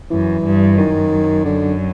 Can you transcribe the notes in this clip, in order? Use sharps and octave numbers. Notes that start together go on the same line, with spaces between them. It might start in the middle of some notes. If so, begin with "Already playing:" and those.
F#2 E3
G2
F#2 D#3
D3